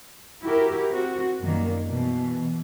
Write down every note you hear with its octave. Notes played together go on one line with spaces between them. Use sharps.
E4 F#4 G4 A#4
C4 F#4
F#2 A#2 D#3 G3 A#3
B2 E3